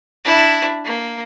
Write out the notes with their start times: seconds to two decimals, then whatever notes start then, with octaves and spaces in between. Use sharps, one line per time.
0.25 D4 E4
0.85 A#3